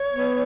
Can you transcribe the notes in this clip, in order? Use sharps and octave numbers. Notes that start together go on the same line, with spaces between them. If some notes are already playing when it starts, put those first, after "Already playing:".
Already playing: C#5
B3